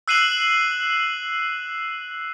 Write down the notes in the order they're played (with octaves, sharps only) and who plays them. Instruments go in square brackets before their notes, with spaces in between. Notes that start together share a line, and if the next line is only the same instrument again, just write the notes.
[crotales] E6 F#6 C7 D#7 E7 F#7